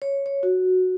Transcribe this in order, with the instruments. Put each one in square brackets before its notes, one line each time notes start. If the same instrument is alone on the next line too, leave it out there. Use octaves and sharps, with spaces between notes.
[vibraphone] C#5
C#5
F#4